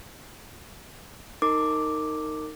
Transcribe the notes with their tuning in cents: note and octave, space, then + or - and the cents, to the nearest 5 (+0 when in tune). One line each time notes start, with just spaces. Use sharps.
D#4 +0 A#4 -25 D6 +0